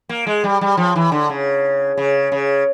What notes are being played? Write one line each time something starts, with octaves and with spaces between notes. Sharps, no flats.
A#3
G#3
G3
G3
F3
E3
D3
C#3
C#3
C#3